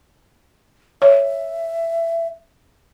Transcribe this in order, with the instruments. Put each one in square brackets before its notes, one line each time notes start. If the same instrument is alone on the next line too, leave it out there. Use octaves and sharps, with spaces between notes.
[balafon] C#5 [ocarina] E5